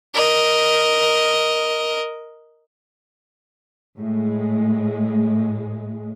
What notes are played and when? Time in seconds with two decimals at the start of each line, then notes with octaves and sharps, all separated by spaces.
0.15 A#4 D#5
3.98 A2 G#3